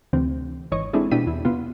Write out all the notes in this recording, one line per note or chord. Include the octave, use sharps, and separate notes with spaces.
D2 C3 E3 C4
G#1 E3 C#5 D#5 C#6
G#3 C4 D4 E4 G#4 A4
B2 D4 E4 G4 B6 D#7
E2 E4
C3 B3 F4